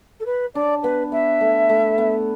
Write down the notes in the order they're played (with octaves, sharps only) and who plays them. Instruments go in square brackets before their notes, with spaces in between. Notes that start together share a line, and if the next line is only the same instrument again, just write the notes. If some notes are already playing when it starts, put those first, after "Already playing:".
[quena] A4
B4
[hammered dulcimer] D4 [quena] D5
[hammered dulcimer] B3 [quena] B4
[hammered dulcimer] B3 [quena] E5
[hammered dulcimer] A3
A3
B3